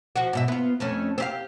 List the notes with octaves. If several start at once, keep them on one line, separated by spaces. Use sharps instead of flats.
F3 F#4
G#2 B2 E5
B3 F4
F2 A3 C#4
C4 G4 F5